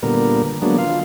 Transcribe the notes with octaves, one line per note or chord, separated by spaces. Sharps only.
A#2 D3 G3 B3 A#4
D3 F#3 G#3 A#3 B3 D4
F4 F5